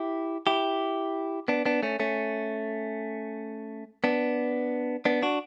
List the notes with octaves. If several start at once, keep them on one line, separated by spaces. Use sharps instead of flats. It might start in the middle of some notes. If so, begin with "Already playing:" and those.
Already playing: E4 G4
E4 G4
B3 D4
B3 D4
A3 C#4
A3 C#4
B3 D4
B3 D4
D4 F#4